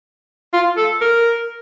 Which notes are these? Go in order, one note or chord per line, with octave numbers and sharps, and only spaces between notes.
F4
A4
A#4